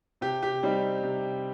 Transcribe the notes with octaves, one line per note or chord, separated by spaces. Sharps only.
C3 G4
G4
G3 C4 D#4
C3